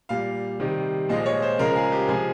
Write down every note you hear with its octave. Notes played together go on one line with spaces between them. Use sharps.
A#2 G3 F5
C3 D#3 G3
A#2 F3 G#3 D#5
C#5
C5
C#3 F3 G#3 A#4
G#4
G4
C3 F3 G#3 G#4